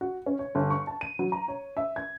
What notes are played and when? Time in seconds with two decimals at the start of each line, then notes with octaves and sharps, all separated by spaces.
0.01 F#4
0.26 C#4
0.39 C#5
0.55 G1
0.70 C#6
0.87 A5
1.01 D#7
1.19 F#3
1.32 A#5
1.48 C#5
1.77 E5
1.96 G#6